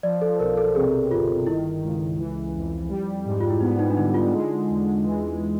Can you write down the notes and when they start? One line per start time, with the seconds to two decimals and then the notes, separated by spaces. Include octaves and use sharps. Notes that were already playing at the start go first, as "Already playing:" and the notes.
0.03 F3 D5
0.21 A4
0.39 B1 A#4
0.57 A4
0.75 C3 G#4
1.11 G1 F4
1.47 D#3 E4
1.82 C#2
2.18 E3
2.54 F2
2.89 G3
3.26 G#2
3.40 F4
3.50 E4
3.61 B3 D#4
3.79 D#4
3.90 D4
3.97 D3 D#4
4.14 F4
4.33 G#3
4.68 E2
5.05 E3